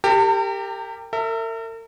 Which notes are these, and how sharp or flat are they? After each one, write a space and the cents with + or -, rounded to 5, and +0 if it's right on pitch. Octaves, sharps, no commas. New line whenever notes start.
G4 +10 A#4 -35 A5 +45
A#4 -45 E5 +0